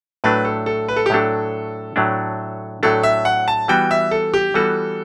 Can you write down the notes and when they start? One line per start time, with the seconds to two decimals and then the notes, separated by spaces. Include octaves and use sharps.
0.24 A2 F#3 A3 D4 B4
0.45 A4
0.66 A4
0.88 B4
0.96 A4
1.06 G4
1.10 A2 F#3 A3 D4 A4
1.96 A2 F#3 A3 D4
2.83 A2 F#3 A3 D4 A4
3.03 E5
3.25 F#5
3.48 A5
3.68 E3 G3 B3 F#4 G5
3.91 E5
4.11 A4
4.34 G4
4.54 E3 G3 B3 F#4 A4